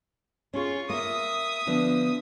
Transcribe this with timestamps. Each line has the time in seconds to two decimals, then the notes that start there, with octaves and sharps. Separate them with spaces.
0.54 C#4 F4 G#4 C#6
0.89 A#3 E5 D#6
1.67 D3 F3 B3